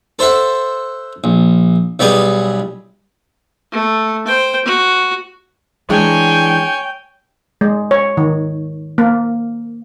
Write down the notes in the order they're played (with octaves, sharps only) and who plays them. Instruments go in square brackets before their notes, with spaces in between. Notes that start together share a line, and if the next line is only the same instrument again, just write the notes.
[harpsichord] A4 C5 E5 F#5
A#1
B1 G3 B3 G4 G#4 G#5
[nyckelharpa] A3
C5 G5
F#4
[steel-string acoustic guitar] E3 G#3 D4 [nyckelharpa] C#5 G#5 [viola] G5
[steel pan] G#3
C#5
D#3
A#3